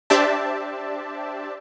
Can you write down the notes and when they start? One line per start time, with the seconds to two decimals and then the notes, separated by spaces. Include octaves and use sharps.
0.10 D4 G4 C5 D5 E5 A5